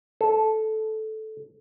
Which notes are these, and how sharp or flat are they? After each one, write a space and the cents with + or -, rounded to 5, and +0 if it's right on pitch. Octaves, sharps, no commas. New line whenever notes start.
A4 -10